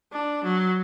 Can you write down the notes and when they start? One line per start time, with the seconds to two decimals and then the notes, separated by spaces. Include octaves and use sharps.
0.13 D4
0.44 F#3